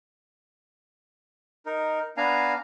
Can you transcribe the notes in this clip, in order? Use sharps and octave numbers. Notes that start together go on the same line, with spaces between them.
D#4 A#4
B3 D4 F5 G#5 A#5